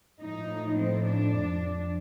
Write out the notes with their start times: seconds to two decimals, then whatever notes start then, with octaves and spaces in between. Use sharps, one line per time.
0.21 A2 F3 D#4
0.79 C4
1.07 D4
1.36 F2